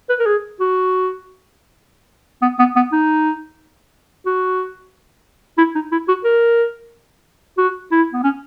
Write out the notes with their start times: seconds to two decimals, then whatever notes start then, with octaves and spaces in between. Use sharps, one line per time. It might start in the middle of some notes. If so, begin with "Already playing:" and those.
0.09 B4
0.19 A#4
0.26 G#4
0.60 F#4
2.42 B3
2.59 B3
2.76 B3
2.92 D#4
4.26 F#4
5.58 E4
5.75 D#4
5.92 E4
6.08 F#4
6.24 A#4
7.58 F#4
7.91 E4
8.13 B3
8.24 C#4